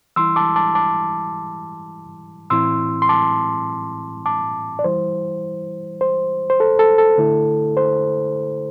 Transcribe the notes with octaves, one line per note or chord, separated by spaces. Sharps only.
E3 G3 E4 C6 E6
A5 D6
A5 D6
A5 D6
A2 E3 C4 E4 C6 E6
C6
A5 D6
A5 D6
D5
E3 G3 E4 C5
C5
C5
A4
A4
A4
D3 A3 E4
C5